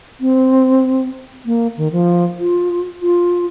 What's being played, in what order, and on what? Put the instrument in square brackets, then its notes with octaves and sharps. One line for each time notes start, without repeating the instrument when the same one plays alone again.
[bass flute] C4
A#3
D#3
F3
F4
F4